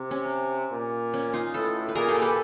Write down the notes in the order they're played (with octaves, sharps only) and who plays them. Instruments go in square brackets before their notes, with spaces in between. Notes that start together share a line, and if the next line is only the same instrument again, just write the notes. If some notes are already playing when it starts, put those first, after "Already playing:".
Already playing: [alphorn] C3
[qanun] C#4
[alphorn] A#2
[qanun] C#4
D#4 F4
[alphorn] A2 [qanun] A4 B4
[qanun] B4
[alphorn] A#2 [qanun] G#4 A#4
[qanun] G4 A4
A4 B4